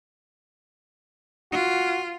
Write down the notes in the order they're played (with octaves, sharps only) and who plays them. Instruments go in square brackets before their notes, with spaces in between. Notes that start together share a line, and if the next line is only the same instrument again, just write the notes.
[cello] F4 [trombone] F#4